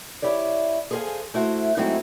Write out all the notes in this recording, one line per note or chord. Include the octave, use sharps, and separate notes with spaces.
E4 G4 C#5 D5
G#4 A4 C5 D#5 F5 G#5
A3 E4 F#4 C5 E5
F#3 G#3 A3 C4 D#4 E4